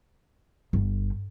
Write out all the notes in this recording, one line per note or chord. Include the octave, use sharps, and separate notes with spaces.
G1